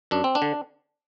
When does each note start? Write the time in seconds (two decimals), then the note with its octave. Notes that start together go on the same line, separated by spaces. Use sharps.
0.11 F#2 D4
0.24 C4
0.35 D4
0.42 D3